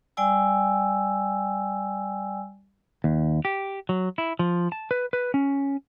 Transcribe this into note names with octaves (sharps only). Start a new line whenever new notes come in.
G3 D5 G5 G#5 E6
D#2
G4
F#3
E4
F3
A5
B4
B4
C#4